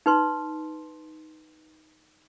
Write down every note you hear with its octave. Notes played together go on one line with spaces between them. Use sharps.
D#4 B4 C6